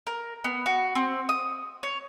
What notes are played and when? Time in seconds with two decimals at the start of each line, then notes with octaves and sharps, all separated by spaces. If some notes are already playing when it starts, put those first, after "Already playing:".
0.07 A#4
0.44 B3
0.66 F#4
0.95 C4
1.29 D#6
1.83 C#5